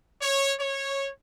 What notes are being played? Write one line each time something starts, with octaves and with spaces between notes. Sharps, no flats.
C#5
C#5